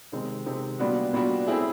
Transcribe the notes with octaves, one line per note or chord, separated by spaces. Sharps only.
C3 D#3 G#3 C4
C3 D#3 G#3 C4
A#2 G3 B3 D4 F#4
A#2 G3 B3 D4 F#4
A3 C4 E4 G#4